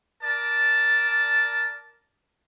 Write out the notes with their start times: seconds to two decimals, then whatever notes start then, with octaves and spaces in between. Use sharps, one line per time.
0.22 A#4 D5 A5